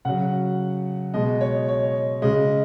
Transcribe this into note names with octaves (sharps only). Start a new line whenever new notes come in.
C#3 F#3 F#5
B2 G#3 D#5
C#5
C#5
C#3 G#3 D#5